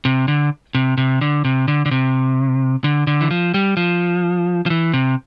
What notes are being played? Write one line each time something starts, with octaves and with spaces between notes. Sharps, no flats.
C3
D3
C3
C3
D3
C3
D3
D3
C3
D3
D3
E3
F3
G3
F3
F3
E3
C3